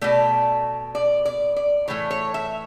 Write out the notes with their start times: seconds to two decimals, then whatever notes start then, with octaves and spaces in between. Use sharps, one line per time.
0.01 B2 A3 D5
0.95 D5
1.25 D5
1.56 D5
1.88 A2 E3 A3 C#5
2.11 C#5
2.34 E5